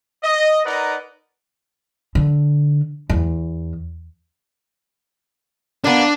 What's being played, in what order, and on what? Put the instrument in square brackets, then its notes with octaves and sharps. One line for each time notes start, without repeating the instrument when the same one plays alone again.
[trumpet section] D#5
D#4 A#4 B4 D5 F#5 A#5
[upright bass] D3
E2
[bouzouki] A#3 B3 [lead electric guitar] D4